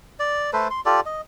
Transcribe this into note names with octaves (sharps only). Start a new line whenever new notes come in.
D5
A3 A4 B4 C5
C6
F4 G4 A4 D5
D#5